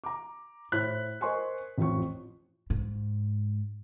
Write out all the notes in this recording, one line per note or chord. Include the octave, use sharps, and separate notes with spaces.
A#5 D6
A2 E4 C5 F#6 B6
A#4 C5 D#5 G#5 C6 C#6
A1 F2 C4 F4 C#6
G#2